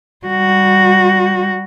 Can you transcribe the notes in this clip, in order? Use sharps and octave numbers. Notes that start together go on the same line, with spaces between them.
G3 F#4